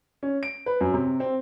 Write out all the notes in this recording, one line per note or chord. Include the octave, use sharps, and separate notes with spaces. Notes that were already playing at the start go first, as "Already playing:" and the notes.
C#4
D7
B4
F#2
C3
C4